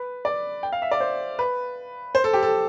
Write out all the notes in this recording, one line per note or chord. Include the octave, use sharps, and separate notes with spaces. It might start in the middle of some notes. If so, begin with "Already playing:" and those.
Already playing: B4
D5
G5
F5
E5
D5
C5
B4
C5
A4
G4
A4